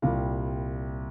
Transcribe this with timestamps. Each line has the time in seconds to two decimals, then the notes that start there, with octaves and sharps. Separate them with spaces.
0.02 C2 A#2 G3 F5